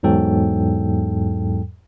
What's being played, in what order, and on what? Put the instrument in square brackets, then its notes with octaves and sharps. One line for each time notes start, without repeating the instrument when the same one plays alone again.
[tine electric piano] E2 G#2 F#3 A4 G5